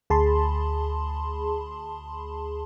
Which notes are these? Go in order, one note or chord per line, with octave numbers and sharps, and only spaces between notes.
D2 G#4 A5 B5 C6